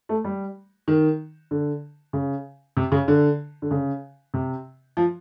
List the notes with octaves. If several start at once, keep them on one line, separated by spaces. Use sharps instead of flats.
A3
G3
D#3
D3
C#3
C3
C#3
D3
D3
C#3
C3
F3